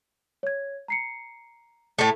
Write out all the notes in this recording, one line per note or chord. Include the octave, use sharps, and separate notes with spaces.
C#5 G#6
A#5 C7 C#7
A2 A3 A4